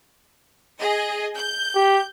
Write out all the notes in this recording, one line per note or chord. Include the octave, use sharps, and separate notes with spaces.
G#4 D#5
G6
G4